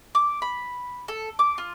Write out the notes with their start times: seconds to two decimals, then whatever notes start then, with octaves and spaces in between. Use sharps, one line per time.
0.15 D6
0.42 B5
1.08 A4
1.39 D6
1.58 F4